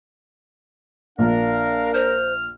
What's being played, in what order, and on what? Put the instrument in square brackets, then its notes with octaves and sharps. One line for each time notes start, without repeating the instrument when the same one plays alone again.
[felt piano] A#1 A#2 [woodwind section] D4 A#4 [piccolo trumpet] F5
[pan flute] C5 [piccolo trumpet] F6